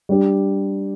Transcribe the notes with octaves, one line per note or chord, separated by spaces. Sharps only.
G3 D4 G4